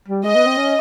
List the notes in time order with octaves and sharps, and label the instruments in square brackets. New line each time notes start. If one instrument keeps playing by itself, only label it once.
[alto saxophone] G3
[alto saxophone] G#3 [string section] D#5
[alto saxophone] B3
C4
C#4